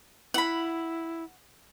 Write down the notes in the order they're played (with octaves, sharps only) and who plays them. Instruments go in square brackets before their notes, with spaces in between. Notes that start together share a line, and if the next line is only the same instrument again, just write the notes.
[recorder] E4 [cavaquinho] F#5 B5